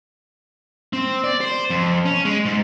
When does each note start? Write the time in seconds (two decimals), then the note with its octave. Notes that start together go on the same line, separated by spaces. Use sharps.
0.93 C4
1.24 D5
1.41 C5
1.70 F2
2.05 C#4
2.25 G#3
2.45 G#2